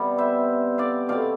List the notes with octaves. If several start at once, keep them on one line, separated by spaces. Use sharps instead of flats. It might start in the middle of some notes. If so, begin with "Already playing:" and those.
Already playing: C3 G3 B3
C5 E5
D5 F5
B2 A3 C4 D5 F5